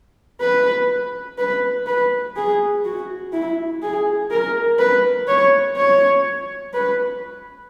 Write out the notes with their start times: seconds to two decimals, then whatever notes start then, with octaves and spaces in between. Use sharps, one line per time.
0.41 B4
1.38 B4
1.87 B4
2.36 G#4
2.85 F#4
3.33 E4
3.82 G#4
4.31 A#4
4.79 B4
5.28 C#5
5.77 C#5
6.74 B4